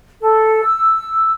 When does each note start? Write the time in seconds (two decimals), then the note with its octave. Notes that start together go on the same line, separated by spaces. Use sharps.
0.20 A4
0.62 E6